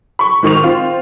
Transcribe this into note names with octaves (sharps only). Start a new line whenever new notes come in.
B5 C#6
G#2 D#3 C#6 F7
C4 F4